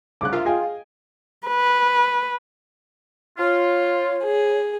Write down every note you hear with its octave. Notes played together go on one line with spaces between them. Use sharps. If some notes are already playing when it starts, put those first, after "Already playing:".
C2 C#3 D6 F#6
F4 A#4 E5 F5
G#4 D#5 F5 G5 G#5
B4
F4 C#5
G#4